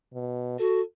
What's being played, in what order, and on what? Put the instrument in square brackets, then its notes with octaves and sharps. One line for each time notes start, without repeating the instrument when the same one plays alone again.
[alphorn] B2
[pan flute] F#4 [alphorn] A4